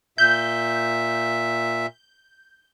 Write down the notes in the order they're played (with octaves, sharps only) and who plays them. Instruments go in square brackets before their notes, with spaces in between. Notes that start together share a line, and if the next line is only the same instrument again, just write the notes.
[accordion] A#2 E5 [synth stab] G6